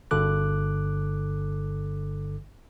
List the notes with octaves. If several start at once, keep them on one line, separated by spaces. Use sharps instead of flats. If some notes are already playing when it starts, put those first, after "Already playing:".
G1 G2 D3 A4 D6 F#6